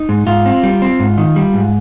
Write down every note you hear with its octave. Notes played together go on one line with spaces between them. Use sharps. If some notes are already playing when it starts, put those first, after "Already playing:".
Already playing: D#4
G#2
G#2 F4
C4
G3
C4
G#2
D#3
G3
G#2